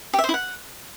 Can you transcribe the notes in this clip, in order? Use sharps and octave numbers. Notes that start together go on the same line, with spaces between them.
G4
E5
C5
E4
F#5